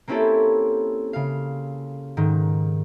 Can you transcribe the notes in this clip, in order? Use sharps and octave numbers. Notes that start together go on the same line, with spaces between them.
A#3 C4 C#4 E4 G4 A4
C#3 F5
G#2 D#3